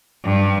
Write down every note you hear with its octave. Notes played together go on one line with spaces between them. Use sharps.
G2